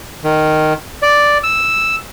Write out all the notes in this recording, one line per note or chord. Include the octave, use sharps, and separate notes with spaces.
D#3
D5
E6